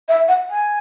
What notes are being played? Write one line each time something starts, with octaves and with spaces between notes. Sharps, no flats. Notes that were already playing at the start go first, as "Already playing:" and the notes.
E5
F#5
G#5